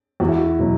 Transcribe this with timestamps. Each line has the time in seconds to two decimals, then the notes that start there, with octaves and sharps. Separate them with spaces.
0.20 E2 F#4
0.29 E4
0.38 F#4
0.59 B2 F#3